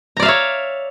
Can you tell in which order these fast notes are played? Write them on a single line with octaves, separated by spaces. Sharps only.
A#5 D5 F5 E5 C#5